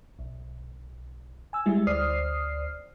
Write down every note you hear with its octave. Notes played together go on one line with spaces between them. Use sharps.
B1
G#5 E6
G3 G#3 E4
D2 C5 D5 D#6 F6 C7